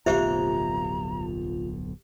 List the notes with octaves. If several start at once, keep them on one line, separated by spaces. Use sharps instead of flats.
D1 B1 F2 F4 G4 C5 E5 A#5